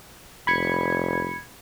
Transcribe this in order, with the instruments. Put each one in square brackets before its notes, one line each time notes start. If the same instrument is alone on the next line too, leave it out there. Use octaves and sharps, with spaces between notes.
[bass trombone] F1 [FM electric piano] B5 G#6 C#7